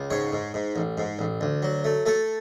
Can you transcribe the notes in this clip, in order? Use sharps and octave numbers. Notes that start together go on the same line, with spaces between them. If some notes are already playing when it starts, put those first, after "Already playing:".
Already playing: C#2
G#2 C#5
G#2
G#2
A1
G#2
A1
D2
F#3
A3
A3 A4